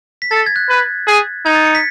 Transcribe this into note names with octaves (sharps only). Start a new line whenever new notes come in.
B6
A4 A6
G#6
F#6
B4
G#4
D#4 G#6
A6
C#7
B6